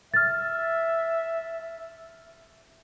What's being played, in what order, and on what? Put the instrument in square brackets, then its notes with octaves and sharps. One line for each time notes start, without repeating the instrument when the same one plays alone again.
[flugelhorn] E5 [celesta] F6 A6